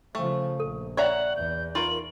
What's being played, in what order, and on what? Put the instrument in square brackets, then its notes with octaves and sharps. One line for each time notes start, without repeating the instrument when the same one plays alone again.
[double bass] C#3 F3 [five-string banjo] A3
[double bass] A#1 [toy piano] A4
[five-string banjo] C#5 E5 A#5 [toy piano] D5 [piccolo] F#5
[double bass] E2 [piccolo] G6
[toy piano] D#4 B5 C#6 [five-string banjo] F4 A#4 [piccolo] F#7